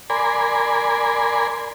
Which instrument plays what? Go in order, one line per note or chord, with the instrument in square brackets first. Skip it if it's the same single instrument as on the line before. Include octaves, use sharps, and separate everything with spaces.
[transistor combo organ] A#4 D5 G#5 B5 C6